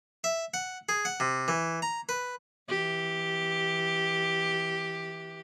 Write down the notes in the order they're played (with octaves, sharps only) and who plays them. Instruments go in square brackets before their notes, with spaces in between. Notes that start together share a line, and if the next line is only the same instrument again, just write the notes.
[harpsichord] E5
F#5
G#4
F#5
C3
E3
A#5
B4
[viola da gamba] E3 G4